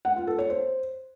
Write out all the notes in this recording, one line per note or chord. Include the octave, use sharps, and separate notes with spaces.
F#5
F4
A4
C#5
C5